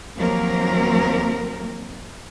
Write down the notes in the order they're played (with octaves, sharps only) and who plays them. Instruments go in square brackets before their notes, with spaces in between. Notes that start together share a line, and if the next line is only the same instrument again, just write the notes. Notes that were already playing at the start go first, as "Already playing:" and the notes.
[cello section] D#2 F3 F#3 A#3 C4 A#4